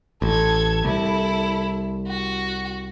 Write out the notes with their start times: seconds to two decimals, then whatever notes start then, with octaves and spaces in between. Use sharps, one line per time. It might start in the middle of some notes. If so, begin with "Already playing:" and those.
0.22 A1 A4 G#6
0.85 C2 E4 A4
2.07 F#4